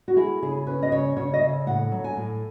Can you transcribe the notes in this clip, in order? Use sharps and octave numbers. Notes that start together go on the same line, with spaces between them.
F#4
E4 G#4
C#3 G#4
C#4 B4
D#5
C#3 C#5
C#3 C#5
D#5
C#3 E5
A2 F#5
F#3
G#5
A2